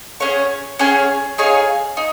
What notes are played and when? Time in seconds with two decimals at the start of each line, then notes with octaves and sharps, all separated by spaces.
0.20 C#4 G#4 C#5 F#5
0.79 C#4 G#4 C#5 F#5
1.38 D#4 G#4 C#5 F5
1.97 D#4